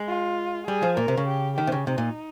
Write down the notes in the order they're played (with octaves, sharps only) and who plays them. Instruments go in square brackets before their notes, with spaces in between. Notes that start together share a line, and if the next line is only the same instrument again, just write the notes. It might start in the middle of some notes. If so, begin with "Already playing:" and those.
Already playing: [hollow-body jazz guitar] G#3
[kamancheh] F4
[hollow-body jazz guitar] G3 [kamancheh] G#4
[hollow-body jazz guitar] F3
[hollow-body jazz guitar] A#2 [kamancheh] A#4
[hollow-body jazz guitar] C3
C#3
[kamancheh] G4
[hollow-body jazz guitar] D#3 [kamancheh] G4
[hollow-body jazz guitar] C3
C#3
[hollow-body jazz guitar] C3 [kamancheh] D#4
[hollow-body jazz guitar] A#2